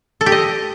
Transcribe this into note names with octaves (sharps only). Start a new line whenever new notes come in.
A4
G4
D#5